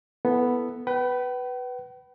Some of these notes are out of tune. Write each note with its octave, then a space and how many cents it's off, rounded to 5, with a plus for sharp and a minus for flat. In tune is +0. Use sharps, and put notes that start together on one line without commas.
B3 +0 E4 +0 A4 +0
B4 +0 G5 -45